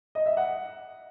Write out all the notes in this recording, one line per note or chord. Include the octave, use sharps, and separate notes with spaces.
D#5
E5
F#5